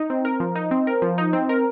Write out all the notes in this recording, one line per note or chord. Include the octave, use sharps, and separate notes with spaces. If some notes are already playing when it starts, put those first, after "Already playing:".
Already playing: D#4
C4
A#4
F3
D#4
C4
A#4
F3
D#4
C4
A#4